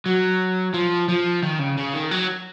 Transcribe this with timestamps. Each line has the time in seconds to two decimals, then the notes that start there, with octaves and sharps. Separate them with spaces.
0.06 F#3
0.74 F3
1.08 F3
1.43 D#3
1.59 C#3
1.77 C#3
1.93 D#3
2.11 F#3